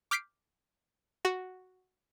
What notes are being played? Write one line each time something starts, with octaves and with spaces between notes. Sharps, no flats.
D6 F6 G6 B6 C7 D7
F#4